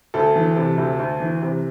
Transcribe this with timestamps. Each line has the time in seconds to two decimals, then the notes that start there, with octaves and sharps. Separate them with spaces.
0.14 D2 A4
0.36 E3
0.56 C3
0.78 D2
1.00 D2
1.20 E3
1.42 C3